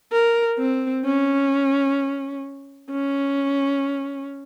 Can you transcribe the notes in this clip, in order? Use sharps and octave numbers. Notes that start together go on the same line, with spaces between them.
A#4
C4
C#4
C#4